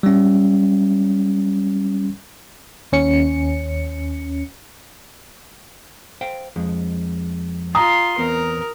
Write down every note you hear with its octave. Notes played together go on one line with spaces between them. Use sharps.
G3 C#4
D#2 C#4 C#7
C5 F5 G5
F2 G#3
F4 A#5 C6 D#6
E2 B3 C4 A#4